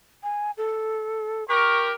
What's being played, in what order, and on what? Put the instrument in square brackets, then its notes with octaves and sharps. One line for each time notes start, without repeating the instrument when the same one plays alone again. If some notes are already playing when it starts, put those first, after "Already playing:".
[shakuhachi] G#5
A4
[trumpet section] G4 A#4 [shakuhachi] C#6